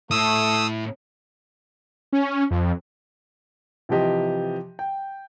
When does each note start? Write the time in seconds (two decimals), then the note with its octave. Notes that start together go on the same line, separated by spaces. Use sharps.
0.11 A2 A3 D#6 E6
2.13 C#4
2.51 F2
3.89 C3 E3 F3 G4 D#5
4.79 G5